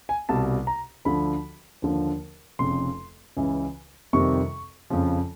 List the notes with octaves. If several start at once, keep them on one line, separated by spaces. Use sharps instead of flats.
G#5
C2 B2 G3 A5
A#5
D2 D3 F3 B5
D#2 D3 F3
F1 F2 C#3 C6
C#2 C#3 E3
F2 C3 D#3 G3 C4 C#6
F2 C#3 F3